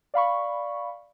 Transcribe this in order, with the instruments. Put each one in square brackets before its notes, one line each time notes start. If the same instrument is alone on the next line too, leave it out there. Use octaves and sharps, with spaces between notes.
[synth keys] D5 F5 B5 C#6